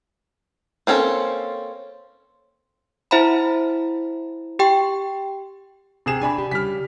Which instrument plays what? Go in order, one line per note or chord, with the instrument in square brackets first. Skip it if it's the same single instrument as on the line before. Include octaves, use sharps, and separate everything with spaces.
[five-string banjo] A#3 C4 C#4 A4
[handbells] E4 C5 E5 F#5 A#5 B5
G4 G5 C#6 C7
[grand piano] C3 G#4 E7
[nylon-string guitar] D4 D5 [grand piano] G#5 B5
[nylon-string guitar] G4
[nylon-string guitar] C#3 G3 G4 [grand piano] F6 B6